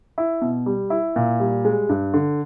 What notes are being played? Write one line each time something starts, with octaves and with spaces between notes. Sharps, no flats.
E4
B2
G3
E4
A#2
G3
G#3
G2
D3